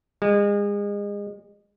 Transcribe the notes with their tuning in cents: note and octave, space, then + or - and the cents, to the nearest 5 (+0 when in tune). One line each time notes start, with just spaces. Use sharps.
G#3 -35